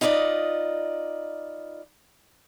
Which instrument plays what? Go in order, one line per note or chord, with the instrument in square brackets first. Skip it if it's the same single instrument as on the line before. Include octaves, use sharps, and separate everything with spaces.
[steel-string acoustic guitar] D#4 F4 B4 D5 D#5